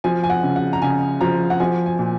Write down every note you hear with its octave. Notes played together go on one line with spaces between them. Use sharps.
F3 G#5
G#5
F#5
C#3
F#5
A#5
C#3 G#5
F3 A#5
F#5
F3 G#5
G#5
A#2